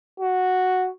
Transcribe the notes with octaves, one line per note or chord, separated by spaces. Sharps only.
F#4